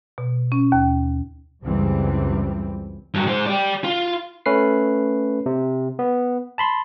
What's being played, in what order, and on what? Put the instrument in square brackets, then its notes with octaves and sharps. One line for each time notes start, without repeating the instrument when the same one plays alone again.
[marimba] B2
C#4
D#2
[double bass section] C#2 F#2 E3 G3 C4
[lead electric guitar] G2 F#3
G#3 C5
G4 D5
F4
[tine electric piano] A3 C#4 B4 C7
C3
B3
A5 B5 C6